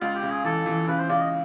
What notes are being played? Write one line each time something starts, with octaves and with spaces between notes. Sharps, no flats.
C#2 F4
G4
C#3
G#4
E3 A4
E3
C#3 B4
C5
C#3 D5
D#5